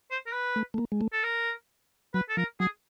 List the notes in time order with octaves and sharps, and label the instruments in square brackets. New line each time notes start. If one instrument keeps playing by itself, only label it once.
[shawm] C5
A#4
B4
[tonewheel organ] A3
A3
A#3
G#3
A3
[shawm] A4
A#4
[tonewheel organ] F#3 [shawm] B4
[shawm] A4
[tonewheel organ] F3 [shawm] A#4
[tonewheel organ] F#3 [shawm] G#4